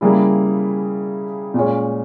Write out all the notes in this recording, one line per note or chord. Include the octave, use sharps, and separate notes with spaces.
C#3 G3 A#3 E4 G#4
A#2 G#3 C#4